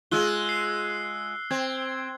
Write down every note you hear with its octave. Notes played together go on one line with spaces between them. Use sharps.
G#3 F4 E6 F#6 G7
C7
C4 G#6